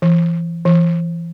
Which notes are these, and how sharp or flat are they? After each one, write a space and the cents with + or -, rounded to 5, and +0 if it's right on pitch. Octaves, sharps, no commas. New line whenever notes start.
E3 +30
E3 +30